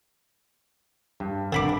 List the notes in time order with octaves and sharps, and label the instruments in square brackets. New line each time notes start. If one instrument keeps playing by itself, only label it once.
[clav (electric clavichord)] G2
[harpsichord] D3 B5 D6